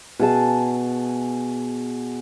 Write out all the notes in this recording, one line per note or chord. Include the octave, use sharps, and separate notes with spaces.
B2 G#4 A5